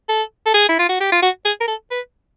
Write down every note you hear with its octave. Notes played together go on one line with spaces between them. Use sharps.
A4
A4
G#4
E4
F4
F#4
G4
F4
F#4
G#4
A#4
A4
B4